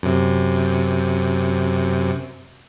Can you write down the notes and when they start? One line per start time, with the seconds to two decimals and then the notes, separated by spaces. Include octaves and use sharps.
0.03 F#2 C3